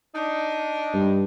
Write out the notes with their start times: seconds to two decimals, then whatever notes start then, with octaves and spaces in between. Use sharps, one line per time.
0.14 D4 D#4
0.94 G2